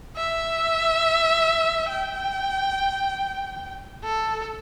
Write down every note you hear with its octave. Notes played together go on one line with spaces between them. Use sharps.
E5
G5
A4